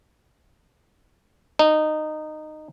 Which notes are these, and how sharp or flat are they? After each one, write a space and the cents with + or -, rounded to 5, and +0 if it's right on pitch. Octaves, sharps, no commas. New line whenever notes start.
D#4 -15